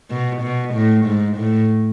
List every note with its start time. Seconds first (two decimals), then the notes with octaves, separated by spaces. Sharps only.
0.10 B2
0.42 B2
0.74 A2
1.05 G#2
1.37 A2